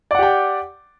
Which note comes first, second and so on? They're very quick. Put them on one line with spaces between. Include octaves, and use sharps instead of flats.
D5 F#5 G4 G5